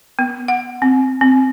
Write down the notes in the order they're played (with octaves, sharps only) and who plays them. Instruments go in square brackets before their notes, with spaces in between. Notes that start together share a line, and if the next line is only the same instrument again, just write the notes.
[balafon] B3
F#5
C4
C4